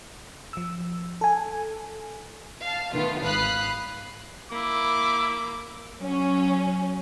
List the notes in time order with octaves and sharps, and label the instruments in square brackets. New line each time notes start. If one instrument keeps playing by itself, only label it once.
[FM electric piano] F3 E6
A4 G#5
[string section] F5 A5
D#3 A3 B3 F4
G#1 F5 B5 D#6 F#6 C7
[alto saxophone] A#3 [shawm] E4 [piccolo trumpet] D6
[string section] F#3 C#4